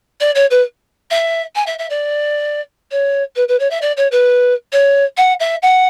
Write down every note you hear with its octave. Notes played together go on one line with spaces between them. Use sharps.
D5
C#5
B4
E5
G#5
E5
E5
D5
C#5
B4
B4
C#5
E5
D5
C#5
B4
C#5
F#5
E5
F#5